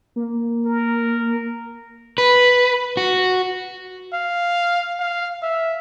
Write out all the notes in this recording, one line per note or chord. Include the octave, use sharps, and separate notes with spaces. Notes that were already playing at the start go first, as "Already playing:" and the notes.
A#3
A#4
B4
F#4
F5
F5
E5